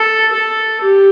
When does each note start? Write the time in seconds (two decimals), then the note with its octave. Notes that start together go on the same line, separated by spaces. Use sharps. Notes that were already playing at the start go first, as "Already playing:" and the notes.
Already playing: A4
0.32 A4
0.81 G4